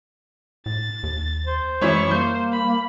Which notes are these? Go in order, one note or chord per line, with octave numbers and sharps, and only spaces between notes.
A2 A6
D#2
C5
F#2 E3 G#3 E4 C#5 C#6
G3 A#3 C5 G6
B5